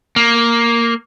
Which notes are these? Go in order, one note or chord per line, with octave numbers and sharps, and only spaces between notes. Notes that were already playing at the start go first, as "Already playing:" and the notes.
A#3